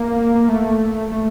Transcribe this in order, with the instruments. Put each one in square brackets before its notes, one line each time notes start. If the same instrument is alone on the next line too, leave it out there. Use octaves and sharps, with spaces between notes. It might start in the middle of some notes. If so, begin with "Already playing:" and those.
Already playing: [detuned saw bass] A#3
A#3
A3
A3